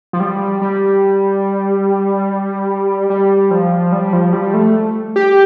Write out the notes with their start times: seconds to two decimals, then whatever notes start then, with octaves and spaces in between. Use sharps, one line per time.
0.13 F3
0.20 G3
0.62 G3
3.10 G3
3.51 F3
3.92 G3
4.13 F3
4.33 G3
4.54 A3
5.16 G4